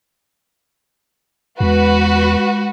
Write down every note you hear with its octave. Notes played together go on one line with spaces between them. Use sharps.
E2 G#3 F#4 B4